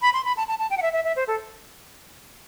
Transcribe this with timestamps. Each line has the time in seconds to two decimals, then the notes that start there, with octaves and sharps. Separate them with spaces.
0.02 B5
0.14 C6
0.25 B5
0.37 A5
0.48 A5
0.59 A5
0.70 G5
0.77 F#5
0.82 E5
0.93 E5
1.04 E5
1.16 C5
1.28 A4